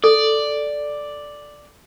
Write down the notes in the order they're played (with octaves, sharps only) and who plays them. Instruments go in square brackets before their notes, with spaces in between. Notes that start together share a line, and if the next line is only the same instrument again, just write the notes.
[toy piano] A4 [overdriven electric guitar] D5